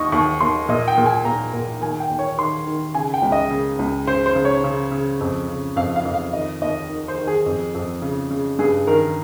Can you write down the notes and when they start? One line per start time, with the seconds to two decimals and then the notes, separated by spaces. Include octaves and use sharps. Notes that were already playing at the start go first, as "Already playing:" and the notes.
Already playing: D#2 D#3 D#5 C#6
0.12 D#2 C#6
0.41 D#2 C6
0.68 A#2 D#5
0.88 G5
0.98 A#2
1.06 G#5
1.25 A#2 A#5
1.54 A#2
1.81 D#3 G#5
2.00 G5
2.10 D#2
2.19 C#5
2.38 D#3 C6
2.67 D#3
2.95 C#3 G#5
3.14 G5
3.22 C#2
3.32 D#5
3.51 C#3
3.79 C#2
4.07 C#3 C5
4.26 C5
4.35 C#3
4.45 C#5
4.64 C#3
4.91 C#3
5.21 F2
5.48 C#3
5.76 F2 F5
5.96 F5
6.05 F2
6.14 F5
6.33 D#3 D#5
6.62 D#2 D#5
6.89 D#3
7.08 C5
7.18 D#3
7.27 G#4
7.46 F2
7.75 F2
8.02 C#3
8.30 C#3
8.59 G2 G#4
8.87 D#3 A#4